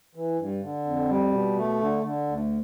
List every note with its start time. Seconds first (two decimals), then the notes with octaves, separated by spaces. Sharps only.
0.15 E3
0.38 G2
0.62 D3
0.85 F2
1.09 G3
1.32 B2
1.57 A3
1.80 D3
2.04 D3
2.28 D2